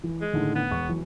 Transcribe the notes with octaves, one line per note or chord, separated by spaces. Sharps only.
E3
G#3
A2 D3 D#3
B3
E1 C#6
E3 F#3